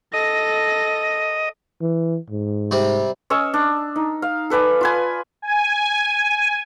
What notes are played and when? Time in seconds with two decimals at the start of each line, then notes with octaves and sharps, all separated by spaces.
0.14 A4 D#5 A#6
1.81 E3
2.30 G#2
2.71 C3 G3
3.30 C#4 D#5 C#6 E6
3.54 D4
3.96 D#4
4.22 F5
4.50 A4 B4 D5 G#5
4.81 F4 B4 G#5
5.42 G#5